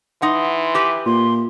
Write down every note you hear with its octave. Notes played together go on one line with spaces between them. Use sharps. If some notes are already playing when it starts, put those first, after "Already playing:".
E3 D#4 F#5 C6
G4 B4
A#2 C6